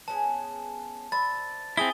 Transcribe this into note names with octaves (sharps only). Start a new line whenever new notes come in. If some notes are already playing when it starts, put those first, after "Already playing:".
B3 C#4 G#4 A5
C5 D5 E5 B5 A6
G#3 C4 E4 G#5 D#6 G7